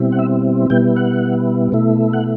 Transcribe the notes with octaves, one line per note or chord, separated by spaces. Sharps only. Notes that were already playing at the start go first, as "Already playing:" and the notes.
Already playing: B2 G3 C4 E4
F#5
E5
B2 G3 B3 E4 G5
F#5
B2 A3 E4
F#5